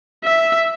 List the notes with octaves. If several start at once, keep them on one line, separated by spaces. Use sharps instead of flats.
E5